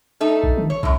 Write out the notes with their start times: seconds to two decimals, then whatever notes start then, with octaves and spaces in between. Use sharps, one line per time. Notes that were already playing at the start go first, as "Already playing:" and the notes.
0.21 A3 D#4 A4
0.43 A#1
0.57 D#3
0.70 C#5
0.83 C2 F#2 A2